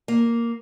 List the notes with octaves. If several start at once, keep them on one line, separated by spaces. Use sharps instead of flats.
A#3